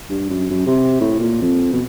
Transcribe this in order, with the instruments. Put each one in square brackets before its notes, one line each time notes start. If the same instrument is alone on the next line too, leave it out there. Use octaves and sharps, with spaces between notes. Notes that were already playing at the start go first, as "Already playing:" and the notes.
[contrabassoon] G2
F#2
F#2
C3
A2
A#2
F2
B2